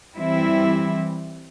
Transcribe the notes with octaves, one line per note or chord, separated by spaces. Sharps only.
E3 G3 C4 E4